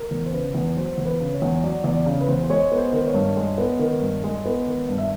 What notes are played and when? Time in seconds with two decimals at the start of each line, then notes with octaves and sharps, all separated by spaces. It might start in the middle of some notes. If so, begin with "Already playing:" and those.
Already playing: A#4
0.11 E2
0.26 C5
0.33 C#3 B4
0.55 E2
0.77 F#3 C5
0.98 E2
1.05 B4
1.20 C#3
1.34 C#5
1.42 E2
1.64 F#3 D5
1.84 E2 D5
2.06 C#3
2.21 B4
2.28 E2 C5
2.44 C5
2.49 G#3 C#5
2.72 B3
2.78 C5
2.93 D#3
3.07 C#5
3.14 G2
3.37 G#3
3.58 B3
3.79 D#3
4.01 G2
4.24 G#3
4.45 B3
4.67 D#3
4.89 G2
4.98 E5